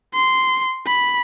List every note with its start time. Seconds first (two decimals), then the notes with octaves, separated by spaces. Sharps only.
0.14 C6
0.87 B5